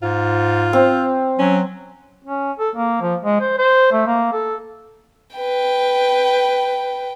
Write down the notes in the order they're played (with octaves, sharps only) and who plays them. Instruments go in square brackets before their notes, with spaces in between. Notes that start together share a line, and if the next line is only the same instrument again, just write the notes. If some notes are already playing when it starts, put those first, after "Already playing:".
[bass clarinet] G#2 [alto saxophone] F4
[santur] C4
[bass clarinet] F#3 [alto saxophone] C#4
[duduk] C#4
A4
A#3
F3
G#3
C5
C5
A3
A#3
A4
[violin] B4 G5